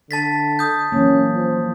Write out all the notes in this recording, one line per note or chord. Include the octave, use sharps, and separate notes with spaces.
D3 A5 A6 B6
D#6 G6
E3 F#3 A#3 C#4
F3